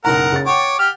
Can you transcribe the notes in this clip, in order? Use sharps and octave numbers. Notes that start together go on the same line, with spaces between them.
F#1 B1 A#4 F#5 A#5
C#3 A6
C#5 F#5 G5 D6
G4 F6